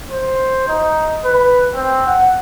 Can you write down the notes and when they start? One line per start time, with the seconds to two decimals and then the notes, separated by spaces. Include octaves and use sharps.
0.11 C5
0.68 D#4
1.25 B4
1.75 C4
2.06 F#5